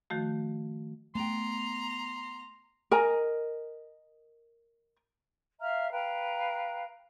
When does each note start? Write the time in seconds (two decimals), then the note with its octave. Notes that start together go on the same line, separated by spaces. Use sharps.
0.10 D#3 F3 A3 F#4
1.15 A3 B3 G5 A#5 C6
2.91 A#4 D#5 G#5 A#5
5.60 E5 F5 A#5 F6
5.92 B4 F5 G5 A#5